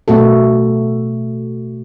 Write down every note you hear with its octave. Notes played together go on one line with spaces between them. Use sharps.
B2 A3 F#4 A4